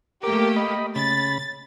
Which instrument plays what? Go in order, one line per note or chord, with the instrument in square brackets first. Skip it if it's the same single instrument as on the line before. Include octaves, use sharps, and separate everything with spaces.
[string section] A3 A#3 G4 [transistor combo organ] A#4 D6
[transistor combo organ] D#5 B5
[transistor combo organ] C#3 B5 [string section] A6